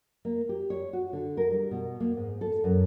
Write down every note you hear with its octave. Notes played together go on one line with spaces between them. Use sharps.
A#3
G4
C#5
F#4
D3
A#4
G3
B2
A#3
G#2
A4
F#2